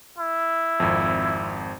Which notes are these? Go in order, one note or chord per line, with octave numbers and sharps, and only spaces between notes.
E4
G#1 F2